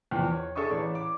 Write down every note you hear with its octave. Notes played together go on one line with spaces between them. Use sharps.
E2 F3 G5
C#5
G#4 A4 E5 C#6 D#6
A1 D5
D6